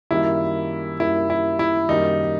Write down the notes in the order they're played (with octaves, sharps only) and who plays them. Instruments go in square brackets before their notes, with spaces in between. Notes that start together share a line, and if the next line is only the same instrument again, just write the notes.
[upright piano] F#2 D#3 G3 A#3 [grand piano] E4
[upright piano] F#2 D#3 G3 A#3 [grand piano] E4
[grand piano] E4
E4
[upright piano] F#2 D#3 G3 A#3 [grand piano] D#4